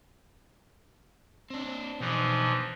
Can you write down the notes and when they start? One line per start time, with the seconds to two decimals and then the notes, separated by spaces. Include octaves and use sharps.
1.50 C4 D4
2.00 B2 E3 F3 D4 D#4